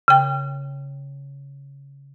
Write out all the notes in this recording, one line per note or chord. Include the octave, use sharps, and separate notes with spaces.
C#3 G5